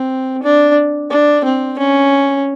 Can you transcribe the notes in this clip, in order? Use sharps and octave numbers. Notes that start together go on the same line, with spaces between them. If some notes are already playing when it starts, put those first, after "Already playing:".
Already playing: C4
D4
D4
C4
C#4